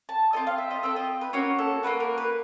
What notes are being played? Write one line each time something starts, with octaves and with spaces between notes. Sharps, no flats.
A5
C4 F4 A4 D#5
F5
E5
D#5
C4 F4 A4 E5
D#5
B4
A#3 C#4 F#4 C#5
A4
A#3 C#4 F#4 B4
A#4
B4